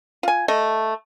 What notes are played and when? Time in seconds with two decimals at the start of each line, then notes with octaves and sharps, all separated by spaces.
0.23 F4 G#5
0.48 A3 D#5